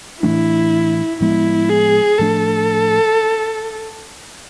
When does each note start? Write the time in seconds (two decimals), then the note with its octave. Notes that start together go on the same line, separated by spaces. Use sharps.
0.22 A2 E3 A3 D4 E4
1.20 A2 F3 G#3 B3 E4
1.70 G#4
2.19 A2 F3 A3 D4 A4